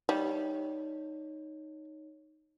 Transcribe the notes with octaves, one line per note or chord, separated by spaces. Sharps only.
G3 D#4 C#5